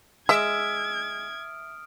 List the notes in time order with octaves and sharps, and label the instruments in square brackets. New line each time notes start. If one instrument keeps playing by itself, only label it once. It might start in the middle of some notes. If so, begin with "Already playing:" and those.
[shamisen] G#3 [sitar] E5 [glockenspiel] D#6 F6 D7 [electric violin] G#6